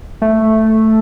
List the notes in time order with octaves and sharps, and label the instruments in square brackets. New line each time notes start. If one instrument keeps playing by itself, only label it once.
[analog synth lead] A3